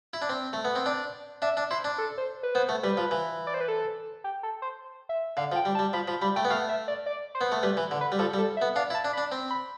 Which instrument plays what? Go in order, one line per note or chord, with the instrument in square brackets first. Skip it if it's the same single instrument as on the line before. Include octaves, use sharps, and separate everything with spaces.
[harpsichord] E4
D4
C4
A3
B3
C4
[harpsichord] D4 [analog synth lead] D5
[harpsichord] D4 [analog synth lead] E5
[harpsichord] D4
[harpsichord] E4 [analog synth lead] C5
[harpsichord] D4
[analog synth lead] A4
C5
B4
[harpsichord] B3 [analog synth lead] C5
[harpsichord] A3
[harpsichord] G3 [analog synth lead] B4
[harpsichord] F3
E3
[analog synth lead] D5
C5
B4
A4
G4
A4
C5
E5
[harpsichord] D3 [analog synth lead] F5
[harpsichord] F3
[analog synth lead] G5
[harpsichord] G3
[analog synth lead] A5
[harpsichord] G3
[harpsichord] F3 [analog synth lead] B5
[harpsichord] F3 [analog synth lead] B5
[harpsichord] G3 [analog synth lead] B5
[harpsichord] A3 [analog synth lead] G5
[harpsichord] B3
[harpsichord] A3 [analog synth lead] F5
[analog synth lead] E5
D5
D5
C5
[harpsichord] B3
A3
[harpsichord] G3 [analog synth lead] B4
[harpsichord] E3
D3
[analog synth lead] B4
[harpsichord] G3
[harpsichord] F3 [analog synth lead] A4
[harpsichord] G3
[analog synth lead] A4
E5
[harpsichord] B3
[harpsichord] D4 [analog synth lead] F5
[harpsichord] E4
[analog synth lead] A5
[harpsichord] D4
[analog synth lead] B5
[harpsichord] D4
C4
[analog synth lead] B5